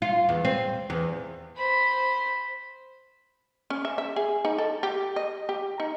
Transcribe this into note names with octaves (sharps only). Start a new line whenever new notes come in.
F4
E2
C4
E2
C5 B5
C#4
E5
E5
G#4
D#4
A4
G4
D#5
G4
D#4